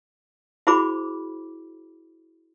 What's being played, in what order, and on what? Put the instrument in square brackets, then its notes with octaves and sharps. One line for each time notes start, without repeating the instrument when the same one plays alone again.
[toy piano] E4 F#4 G#4 C5 B5 D6